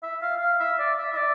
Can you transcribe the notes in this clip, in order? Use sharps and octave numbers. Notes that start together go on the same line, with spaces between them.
E5
F5
F5
E5
D5
E5
E5
D5